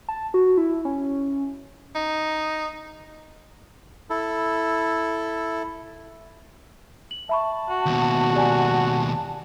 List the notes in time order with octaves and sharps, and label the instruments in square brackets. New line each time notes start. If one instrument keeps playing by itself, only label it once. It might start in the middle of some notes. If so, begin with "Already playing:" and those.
[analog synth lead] A5
F#4
E4
C#4
[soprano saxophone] D#4
[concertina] E4 A4
[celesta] F#7
[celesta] E5 B5 C#6 [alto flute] A5
[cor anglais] F#4
[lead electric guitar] D#2 B2
[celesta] G4 D5 G#5